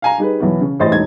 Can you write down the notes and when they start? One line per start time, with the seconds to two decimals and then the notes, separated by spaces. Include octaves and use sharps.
0.02 F5 G#5 A#5
0.18 G3 D#4 G#4 B4
0.40 B1 E3 F#3 B3
0.61 C#3
0.80 A1 E3 C5 D#5 C6 A6
0.92 E1 D#4 G#6